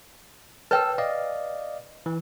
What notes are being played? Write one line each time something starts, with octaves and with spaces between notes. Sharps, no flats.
B4 C#5 G5 A5 E6
D5 D#5 F5
E3